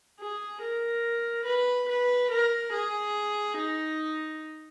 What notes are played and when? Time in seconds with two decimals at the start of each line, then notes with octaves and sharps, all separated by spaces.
0.20 G#4
0.62 A#4
1.46 B4
1.89 B4
2.31 A#4
2.73 G#4
3.57 D#4